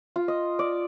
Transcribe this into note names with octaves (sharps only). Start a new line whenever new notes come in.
F4
D#5
D5